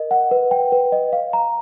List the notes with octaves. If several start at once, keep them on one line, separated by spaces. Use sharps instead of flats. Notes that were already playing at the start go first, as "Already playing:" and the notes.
Already playing: A#4 D#5
F#5
B4
G5
B4
D#5
F5
A#5